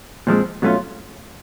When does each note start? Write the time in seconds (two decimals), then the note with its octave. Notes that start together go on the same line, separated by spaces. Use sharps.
0.27 A#2 F3 G#3 C4
0.62 B2 F#3 A3 C#4 F4